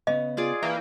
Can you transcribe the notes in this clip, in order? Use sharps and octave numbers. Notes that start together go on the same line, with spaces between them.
C#3 B3 D#5
F4 G#4 D5
E3 A#3 G5